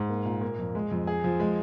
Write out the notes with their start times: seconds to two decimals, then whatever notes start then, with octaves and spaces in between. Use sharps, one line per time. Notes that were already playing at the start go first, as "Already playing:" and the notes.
Already playing: G#2
0.09 A#3
0.25 A#2
0.41 A#3
0.59 F2
0.75 G#3
0.91 F2
1.07 G#4
1.24 F3
1.40 G#3